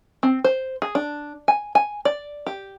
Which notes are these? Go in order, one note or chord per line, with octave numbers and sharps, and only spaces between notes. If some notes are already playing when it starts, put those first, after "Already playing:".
C4
C5
G#4
D4
G#5
G#5
D5
G4